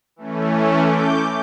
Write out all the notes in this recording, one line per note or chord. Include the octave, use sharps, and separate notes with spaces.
E3 A3 C#4
D6 G6